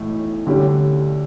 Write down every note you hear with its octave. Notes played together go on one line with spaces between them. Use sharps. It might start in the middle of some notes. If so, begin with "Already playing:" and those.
Already playing: B1 A2 E3 A3
D2 D3 G3 C#4 G4